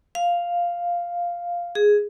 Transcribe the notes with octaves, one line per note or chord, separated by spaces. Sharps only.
F5
G#4